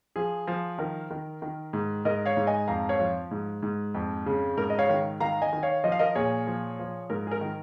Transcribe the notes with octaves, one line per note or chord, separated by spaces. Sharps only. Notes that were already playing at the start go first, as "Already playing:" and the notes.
F3 G#4
F3
D#3 A#4
D#3
D#3
G#2
G#2 A#4 D#5
C#5 F5
G#2
D#5 G#5
F2 F5 A#5
C#5 F5
F3
G#2
G#2
F2
C#3
G#2 A#4
D#5
C#5 F5
D#3
D#3 F5 A#5
D#5 G#5
D#3
C#5 F5
F3 D#5
F5
A#4 D#5
A#2 G#4 C#5
F3
F3
G#2 A#4
G#4
A#4
D#3